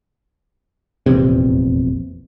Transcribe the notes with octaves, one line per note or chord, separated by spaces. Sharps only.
F1 A#1 E2 C3